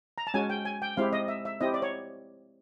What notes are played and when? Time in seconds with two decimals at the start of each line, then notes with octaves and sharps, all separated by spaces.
0.18 A#5
0.27 A5
0.34 G#3 C#4 F#4 G#5
0.50 G5
0.65 G#5
0.82 G5
0.97 G#3 C4 E4 G4 F5
1.13 D#5
1.28 E5
1.45 E5
1.61 C4 E4 G4 D#5
1.74 D5
1.82 C#5